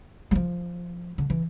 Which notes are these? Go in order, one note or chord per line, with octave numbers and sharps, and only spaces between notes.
G3
F3
D3
E3